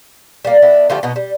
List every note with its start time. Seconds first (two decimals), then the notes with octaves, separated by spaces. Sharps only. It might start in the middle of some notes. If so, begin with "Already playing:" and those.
0.45 G3 A#3
0.62 B3 D4 E4
0.90 D3 F3 A3 G4
1.03 B2 B3 D#4
1.16 G3